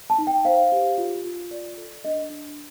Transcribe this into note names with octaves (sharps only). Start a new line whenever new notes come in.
A5
D#4
G5
C5 F5
G4
F4
F4
D5
A4
D4 D#5
D4